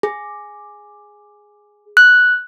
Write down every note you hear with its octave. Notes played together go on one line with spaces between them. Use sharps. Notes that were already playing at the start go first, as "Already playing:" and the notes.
G#4
F#6